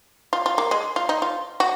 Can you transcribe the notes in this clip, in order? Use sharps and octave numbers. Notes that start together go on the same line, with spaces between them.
F4
F4
A#3
G#3
F4
D#4
F4
F#4